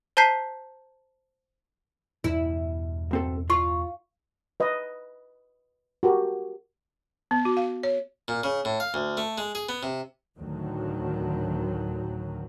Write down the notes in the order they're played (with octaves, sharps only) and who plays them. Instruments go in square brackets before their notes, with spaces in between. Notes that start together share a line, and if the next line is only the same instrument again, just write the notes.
[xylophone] C5 A5 A#5 G6 B6 C7
[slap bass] E2 G2 B2 [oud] E4
[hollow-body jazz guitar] B1 C4 A4
[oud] F4 [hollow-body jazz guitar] C6 [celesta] C#6
[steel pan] B4 D#5
F#4 G4 A#4
[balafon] B3
F#4
F5
C#5
[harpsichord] A#2
C#3
A2
F5
D2
A3
G#3
G#4
B3
C3
[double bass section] D2 A2 D#3 F#3